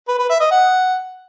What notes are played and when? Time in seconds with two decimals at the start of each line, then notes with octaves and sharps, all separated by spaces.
0.08 B4
0.19 B4
0.30 E5
0.40 D#5
0.51 F#5